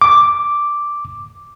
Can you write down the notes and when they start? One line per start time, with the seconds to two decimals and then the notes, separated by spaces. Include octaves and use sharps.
0.01 D6